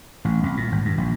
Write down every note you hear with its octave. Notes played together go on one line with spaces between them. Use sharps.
A1
C2
A#2
G#1
G2
A#1